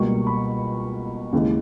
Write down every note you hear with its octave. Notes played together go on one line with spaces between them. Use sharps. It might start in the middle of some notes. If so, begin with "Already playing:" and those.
Already playing: C#2 B2 G3 A#3 C#6
B5
D#2 C#3 E3 G#3